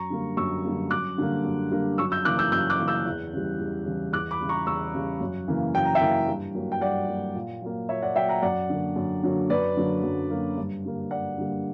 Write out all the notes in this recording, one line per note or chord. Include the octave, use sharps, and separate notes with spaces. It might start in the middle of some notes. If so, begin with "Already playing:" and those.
Already playing: F#2 A#5 C#6
D3 G3 A#3
F#2 C#6 E6
D3 G3 A#3
F#2 D6 F#6
D3 G3 A#3
F#2
D3 G3 A#3
F#2 C#6 E6
E6 G6
C#3 E3 A#3 D6 F#6
E6 G6
F#2 E6 G6
D6 F#6
C#3 E3 A#3
E6 G6
E2
C#3 E3 G3
E2
C#3 E3 G3
E2 D6 F#6
B5 D6
C#3 G3
A#5 C#6
E2 C#6 E6
C#3 G3
F#2
C#3 E3 A#3
F#2 G5
A#5
E5 G5
C#3 E3 A#3
G2
F#3 A#3
G5
G2 D5 F#5
F#3 A#3
A#2
F#3 A#3
A#2 C#5 E5
D5 F#5
F#3 A#3 E5 G5
F#5 A#5
F#2 D5 F#5
D3 F#3 A#3
F#2
D3 F#3 A#3
F#2 B4 D5
D3 F#3 A#3
F#2
D3 F#3 A#3
G2
D3 G3 A#3
G2 D5 F#5
D3 G3 A#3